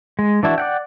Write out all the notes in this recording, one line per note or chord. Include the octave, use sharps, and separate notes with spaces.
G#3
E3 D4 E4 F#4
D5 F#5 G5